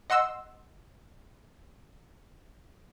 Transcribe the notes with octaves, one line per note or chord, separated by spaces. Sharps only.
D#5 F#5 C6 E6